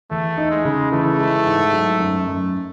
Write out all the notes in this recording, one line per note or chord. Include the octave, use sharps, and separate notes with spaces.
E2 A3
D#4
G#3
C#3
E3 A3
G#3
G#2
F#3
F#2
F#2